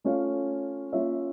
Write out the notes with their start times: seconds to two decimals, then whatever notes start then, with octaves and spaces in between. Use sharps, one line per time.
0.04 A3 C#4 F4 C#5 F5
0.92 A#3 C#4 F4 C#5 E5